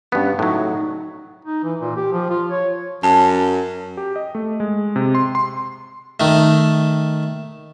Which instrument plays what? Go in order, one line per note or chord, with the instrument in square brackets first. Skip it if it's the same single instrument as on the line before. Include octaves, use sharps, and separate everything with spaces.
[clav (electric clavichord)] G2 B3 [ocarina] C#4
[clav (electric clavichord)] A2 F#3 [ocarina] D#4
[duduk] D#4
E3
A#2
G4
F3
F4
C#5
[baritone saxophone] F#2 [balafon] A5
[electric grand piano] G4
D#5
A3
G#3
C3
C6
C6
[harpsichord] D#3 A3